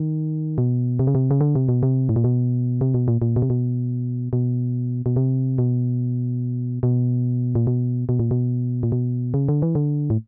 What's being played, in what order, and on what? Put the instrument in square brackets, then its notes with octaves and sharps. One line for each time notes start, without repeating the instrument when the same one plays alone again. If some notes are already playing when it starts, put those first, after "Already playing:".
Already playing: [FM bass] D#3
B2
C3
C#3
C3
C#3
D3
C3
B2
C3
A2
A#2
B2
C3
B2
A#2
A#2
B2
C3
B2
B2
B2
C3
B2
B2
A#2
B2
B2
A#2
B2
A#2
B2
C#3
D3
E3
D3
A2